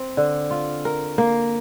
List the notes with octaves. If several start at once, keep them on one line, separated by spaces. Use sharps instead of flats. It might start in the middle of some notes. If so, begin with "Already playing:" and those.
Already playing: C4
D3
F4
A#4
A#3